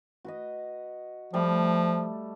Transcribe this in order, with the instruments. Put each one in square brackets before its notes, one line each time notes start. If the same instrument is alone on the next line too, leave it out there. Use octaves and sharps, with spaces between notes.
[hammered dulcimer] F#4 B4 D#5
[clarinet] F3 [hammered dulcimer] G3 A3